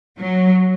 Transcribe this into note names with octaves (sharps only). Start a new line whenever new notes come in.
F#3